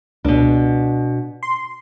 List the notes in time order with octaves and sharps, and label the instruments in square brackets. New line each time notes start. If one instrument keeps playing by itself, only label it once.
[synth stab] C#2 [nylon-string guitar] B2 D4
[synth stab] C6